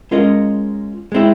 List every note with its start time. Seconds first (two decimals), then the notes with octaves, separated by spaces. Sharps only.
0.11 G#3 C#4 F4 A#4 D#5
1.12 G#3 C4 E4